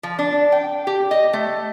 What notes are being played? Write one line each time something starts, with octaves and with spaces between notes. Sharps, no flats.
F3
D4
G5
G4
D#5
A3